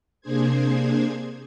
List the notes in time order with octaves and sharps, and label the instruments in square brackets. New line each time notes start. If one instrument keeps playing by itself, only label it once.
[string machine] C3 A#3 D4 G#4 C5 G#6